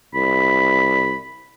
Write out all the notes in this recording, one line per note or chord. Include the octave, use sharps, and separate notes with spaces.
C2 B5